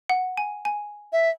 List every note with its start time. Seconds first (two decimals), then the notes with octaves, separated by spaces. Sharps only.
0.10 F#5
0.37 G#5
0.65 G#5
1.13 E5